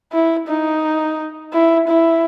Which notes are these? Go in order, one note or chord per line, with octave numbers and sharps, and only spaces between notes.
E4
D#4
E4
E4